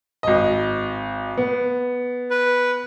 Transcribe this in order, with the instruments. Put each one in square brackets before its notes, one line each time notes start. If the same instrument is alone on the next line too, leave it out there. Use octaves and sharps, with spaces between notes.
[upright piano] G#1 D#5
B3
[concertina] B4